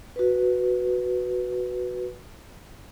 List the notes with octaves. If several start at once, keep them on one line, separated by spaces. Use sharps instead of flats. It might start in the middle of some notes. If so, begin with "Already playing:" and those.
F#4 B4